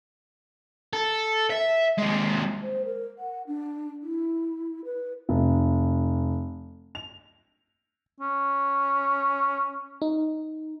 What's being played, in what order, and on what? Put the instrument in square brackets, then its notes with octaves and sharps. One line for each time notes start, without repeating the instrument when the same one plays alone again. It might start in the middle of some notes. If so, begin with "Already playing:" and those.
[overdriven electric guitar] A4
E5
D#2 G#3
[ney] C5
A#4
F#5
D4
E4
B4
[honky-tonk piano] F1
F7
[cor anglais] C#4
[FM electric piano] D#4